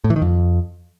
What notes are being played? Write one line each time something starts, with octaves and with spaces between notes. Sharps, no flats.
A2
E3
D#3
F2